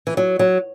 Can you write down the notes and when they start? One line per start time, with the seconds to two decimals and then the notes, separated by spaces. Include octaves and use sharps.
0.07 E3
0.17 F#3
0.39 F#3